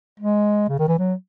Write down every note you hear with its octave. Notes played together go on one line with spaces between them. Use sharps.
G#3
C#3
D#3
E3
F#3